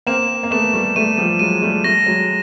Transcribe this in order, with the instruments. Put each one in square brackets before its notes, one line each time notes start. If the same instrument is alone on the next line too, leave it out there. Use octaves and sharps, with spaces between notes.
[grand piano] A#3 C4 [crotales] E7
[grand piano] A#3
[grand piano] A3 B3 [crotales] E7
[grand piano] G3 A3
[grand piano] G3 A3 [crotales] D#7
[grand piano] F3 G3
[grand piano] F#3 G#3 [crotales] D#7
[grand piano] G3 A3
[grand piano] G3 A3 [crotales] A#6
[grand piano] F#3 G#3